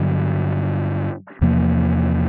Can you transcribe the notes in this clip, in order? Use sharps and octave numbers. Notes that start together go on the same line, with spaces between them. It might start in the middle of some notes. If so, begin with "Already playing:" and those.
Already playing: G2 D3 F#3
E2 C3 F3 A#3